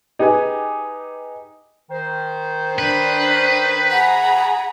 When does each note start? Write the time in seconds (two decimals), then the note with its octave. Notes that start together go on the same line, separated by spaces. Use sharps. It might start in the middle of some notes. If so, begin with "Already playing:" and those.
0.19 D#4 G4 G#4 B4 G#5
1.90 D#3 C5
2.79 D4 B4
3.91 G#4 F#5 A#5 B5